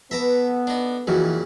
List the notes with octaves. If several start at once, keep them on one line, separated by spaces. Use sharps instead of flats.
B3 A4 B4 E5 A#5 D6
D4 D#4
F2 A#2 C#3 E3 F#4 D#5